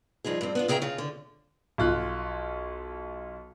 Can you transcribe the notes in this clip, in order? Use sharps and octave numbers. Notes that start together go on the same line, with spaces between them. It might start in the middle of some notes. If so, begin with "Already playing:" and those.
G2 F3 D#4 G#4
G2 C4
B3 D4 F4
C#3 G#4 E5 G5 A#5
C#3 F4
D3
B1 F4 F#6